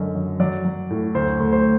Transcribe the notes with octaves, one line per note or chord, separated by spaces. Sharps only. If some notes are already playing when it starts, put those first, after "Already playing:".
Already playing: F#2 D3 D#5
F#3
F#3 D5
F#3
A2
D2 C5
D2
C5